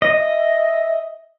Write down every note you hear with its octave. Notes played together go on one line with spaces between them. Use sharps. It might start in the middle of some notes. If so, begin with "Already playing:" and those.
D#5
E5